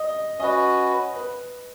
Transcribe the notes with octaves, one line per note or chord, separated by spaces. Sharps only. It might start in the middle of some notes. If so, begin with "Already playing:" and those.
Already playing: D#5
C#4 F#4 B4 D#5
B4